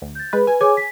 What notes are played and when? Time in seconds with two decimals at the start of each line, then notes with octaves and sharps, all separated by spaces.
0.02 D2
0.15 G6 A6
0.33 G#3 B4
0.47 B4 G#5
0.61 G#4 C#5 G#5 D6
0.77 B6